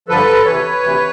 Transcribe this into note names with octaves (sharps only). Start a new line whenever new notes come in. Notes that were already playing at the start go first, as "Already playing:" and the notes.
G2 D3 F3 A4 B4
D2 C3 E3 B4 C#5
D2 C3 E3